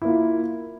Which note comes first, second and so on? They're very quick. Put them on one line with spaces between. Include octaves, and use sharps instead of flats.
E4 A#3 F4